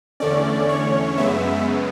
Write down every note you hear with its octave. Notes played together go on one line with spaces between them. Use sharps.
E2 D3 A3 C#4 D5
C#5
F#2 C#3 G#3 B3 E5